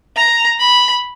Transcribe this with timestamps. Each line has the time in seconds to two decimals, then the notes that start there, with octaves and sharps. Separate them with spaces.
0.16 A#5
0.60 B5